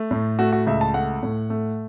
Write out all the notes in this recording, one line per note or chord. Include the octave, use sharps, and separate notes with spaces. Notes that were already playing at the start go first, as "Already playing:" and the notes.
Already playing: A3
A2
A3 F#4
F#4
C#2 E5
A5
A3 F#5
A2
A3